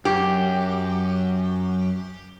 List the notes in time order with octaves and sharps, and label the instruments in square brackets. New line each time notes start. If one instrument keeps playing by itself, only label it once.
[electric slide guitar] F#2 [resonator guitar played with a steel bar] G4